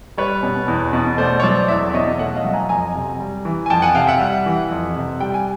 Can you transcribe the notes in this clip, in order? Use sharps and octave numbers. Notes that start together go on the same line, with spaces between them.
G3 B4 C#5
B2
E2
B2
A3 C5 D5
C#5
F#3 C5 D5
E2 D5 E5
D5
B2 C#5 D#5
A3 E5 F#5
D#5 F5
F#3
G#5 A#5
F2 G#5 A#5
C3
G3
E3
G#5
F2 G5 A5
F#5 G#5
C3 F5 G5
E5 F#5
G3
E3
F2
C3
G3 G5
G#5